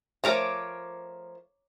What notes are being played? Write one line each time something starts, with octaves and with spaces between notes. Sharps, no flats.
F3 A3 A#4 C#5 A#5 D6